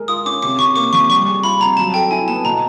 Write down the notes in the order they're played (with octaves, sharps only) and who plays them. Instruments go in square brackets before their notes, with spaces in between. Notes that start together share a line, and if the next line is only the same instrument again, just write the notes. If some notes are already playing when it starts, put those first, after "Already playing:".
Already playing: [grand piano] G#3 A#4
[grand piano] F4 [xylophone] D#6
[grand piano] C#4 [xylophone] D6
[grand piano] C3 [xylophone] D6
[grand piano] C3 [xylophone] C#6
[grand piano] A#3 [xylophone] D6
[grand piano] F3 [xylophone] C#6
[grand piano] G3 [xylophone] C#6
[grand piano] G#4
[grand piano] F4 [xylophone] B5
[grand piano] C4 [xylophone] A#5
[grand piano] F#3 [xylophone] A5
[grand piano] A4 [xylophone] G5
[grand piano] E4 [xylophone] G#5
[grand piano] B3 [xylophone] A5
[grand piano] B2 [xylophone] A#5